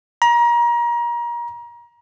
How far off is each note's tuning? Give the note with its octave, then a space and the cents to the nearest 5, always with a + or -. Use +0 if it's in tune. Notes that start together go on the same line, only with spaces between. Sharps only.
A#5 +30